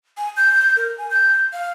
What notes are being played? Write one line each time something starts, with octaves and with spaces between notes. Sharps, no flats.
G#5
G6
A#4
G#5
G6
F5